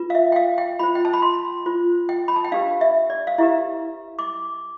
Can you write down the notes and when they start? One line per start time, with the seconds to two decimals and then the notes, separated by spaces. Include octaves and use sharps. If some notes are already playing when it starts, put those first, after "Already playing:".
Already playing: F4 B4
0.10 F5
0.15 E5
0.32 G5
0.36 F5
0.58 G5
0.79 F4 C5 B5
0.95 G5
1.05 A5
1.13 B5
1.22 C6
1.66 F4 C5
2.09 G5
2.28 B5
2.36 A5
2.44 G5
2.52 D4 G4 B4 F5
2.81 E5
3.10 D5
3.27 F5
3.38 E4 G4 B4 E5
4.19 D6